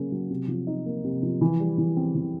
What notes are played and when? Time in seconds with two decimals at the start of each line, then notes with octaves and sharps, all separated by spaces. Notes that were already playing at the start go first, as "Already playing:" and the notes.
Already playing: C#3 F#3 A#3 C#4
0.12 F#3
0.30 C3
0.48 F3
0.67 D#4
0.86 A#3
1.04 C3
1.23 F3
1.41 E3
1.60 G3
1.78 E3
1.97 C4
2.15 E3